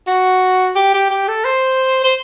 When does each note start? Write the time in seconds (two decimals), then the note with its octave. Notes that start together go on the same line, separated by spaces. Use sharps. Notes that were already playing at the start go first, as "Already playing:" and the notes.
0.07 F#4
0.76 G4
0.94 G4
1.10 G4
1.28 A4
1.45 C5
2.04 C5